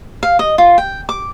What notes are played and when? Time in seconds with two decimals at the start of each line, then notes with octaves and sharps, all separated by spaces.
0.23 F5
0.39 D#5
0.58 F4
0.78 G5
1.09 D6